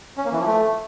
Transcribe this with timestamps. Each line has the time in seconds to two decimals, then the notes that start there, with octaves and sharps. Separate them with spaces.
0.18 C#4
0.25 A#3
0.32 E3
0.39 F3
0.46 A3